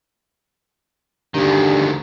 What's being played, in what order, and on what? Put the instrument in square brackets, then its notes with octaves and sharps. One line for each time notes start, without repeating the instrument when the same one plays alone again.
[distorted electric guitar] D2 D#3 [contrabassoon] G2